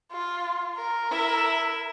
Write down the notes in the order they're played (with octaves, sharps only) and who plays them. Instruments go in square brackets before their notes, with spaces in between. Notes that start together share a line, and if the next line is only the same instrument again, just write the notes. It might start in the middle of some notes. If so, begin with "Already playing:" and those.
[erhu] F4
A#4
[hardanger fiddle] E4 E5